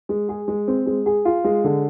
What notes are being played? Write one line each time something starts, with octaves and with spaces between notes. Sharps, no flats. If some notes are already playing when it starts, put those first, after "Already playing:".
G#3
G#4
G#3
C4
G#3
G#4
F4
G#3
D3